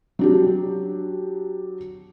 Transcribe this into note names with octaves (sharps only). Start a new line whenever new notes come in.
F#3 D4 G4